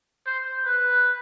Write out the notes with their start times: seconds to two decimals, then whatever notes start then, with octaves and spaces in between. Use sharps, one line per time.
0.27 C5
0.66 B4